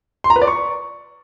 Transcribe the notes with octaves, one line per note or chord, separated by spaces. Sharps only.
C6
A#5
B4
D5
C#6